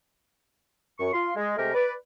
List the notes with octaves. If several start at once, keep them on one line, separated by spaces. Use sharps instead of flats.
F#2 C#6
F4 C6
G#3
C3 G#3 A3 G4 A#4
B4 D5